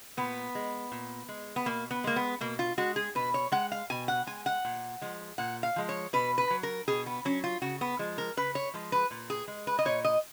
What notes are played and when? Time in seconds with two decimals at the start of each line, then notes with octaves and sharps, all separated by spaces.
0.17 A#2 B3
0.55 G#3
0.92 A#2
1.29 G#3
1.56 B3
1.66 B2 A#3
1.91 B3
2.04 G#3 A#3
2.16 B3
2.41 B2 A#3
2.59 F4
2.78 G#3 F#4
2.96 G#4
3.15 B2 B4
3.34 C#5
3.52 G#3 F#5
3.72 F5
3.90 B2 G#5
4.08 F#5
4.27 G#3 G#5
4.46 F#5
4.65 A#2
5.02 F3 G#3
5.38 A#2 F#5
5.63 F5
5.76 F3 G#3
5.89 C#5
6.13 B2 B4
6.38 B4
6.50 F#3
6.63 A#4
6.88 B2 G#4
7.06 B3
7.25 F#3 C#4
7.44 F4
7.62 C#3 F#4
7.81 B3
7.99 F3 G#3
8.18 A#4
8.37 C#3 B4
8.55 C#5
8.74 F3 G#3
8.92 B4
9.11 A#2
9.30 G#4
9.48 G#3
9.67 B4
9.79 D#5
9.85 A#2 C#5
10.05 D#5